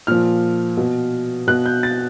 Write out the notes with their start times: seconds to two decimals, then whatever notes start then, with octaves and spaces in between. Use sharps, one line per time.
0.07 A#2 F3 F6
0.77 B2
1.47 B2 F#6
1.66 G6
1.83 A6